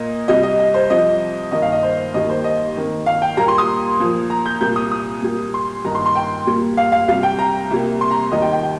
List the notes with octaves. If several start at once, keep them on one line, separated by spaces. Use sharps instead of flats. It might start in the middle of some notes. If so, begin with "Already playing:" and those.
Already playing: A#2 A#3 D#5
C2 C3 G3 D#5
D#5
D#5
C5
C2 C3 F3 D#5
G2 D#3 A#3 D#5
F5
D#5
C5
D#2 D#3 G3 A#3 D#5
C5
D#5
F2 D#3 A#3
F5
G5
A#2 G3 A#3 A#5
C6
D#6
A#2 F3 A#3
A#5
G6
C2 A#2 G3 A#3 G6
D#6
D#6
A#2 G3 A#3
C6
G2 D#3 A#3 A#5
C6
C6
G5
A#2 G3 A#3
F5
F5
C2 C3 G3 F5
G5
A#5
C2 C3 G3 A#3
C6
A#5
D#2 D#3 G3 D#5
G5
G5
G5